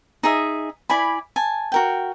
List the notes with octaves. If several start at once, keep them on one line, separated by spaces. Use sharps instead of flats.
D#4 G#4 E5
E4 D5 G#5 B5
G#5 A5
F#4 A#4 G5